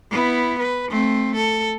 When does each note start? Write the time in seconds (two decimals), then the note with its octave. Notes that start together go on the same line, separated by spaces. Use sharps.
0.11 B3 E4
0.59 B4
0.89 A3 C4
1.35 A4